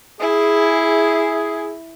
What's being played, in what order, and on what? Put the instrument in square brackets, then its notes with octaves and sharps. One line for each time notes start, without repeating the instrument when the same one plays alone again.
[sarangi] E4 [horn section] G#4